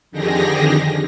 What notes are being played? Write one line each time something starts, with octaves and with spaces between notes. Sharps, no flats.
F2 D3 D#3 G4 G#4 A#6